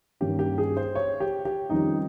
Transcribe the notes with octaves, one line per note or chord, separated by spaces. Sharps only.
G2 D#3 A#3 C#4 G4
G4
G#4
C5
C#5
G4
G4
F2 D#3 G3 C#4 D#4